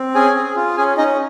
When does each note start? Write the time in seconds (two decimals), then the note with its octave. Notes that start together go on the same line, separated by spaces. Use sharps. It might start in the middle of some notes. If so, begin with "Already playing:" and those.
Already playing: C4
0.14 C#4 G#4 G#5
0.36 G#4
0.56 F4
0.77 C#4 G#4 G#5
0.97 C#4 D#4 D#5